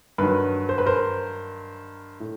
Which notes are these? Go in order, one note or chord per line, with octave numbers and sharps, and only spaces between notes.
G2 D#3 F#3 B4
C5
B4
A#4 C5
A2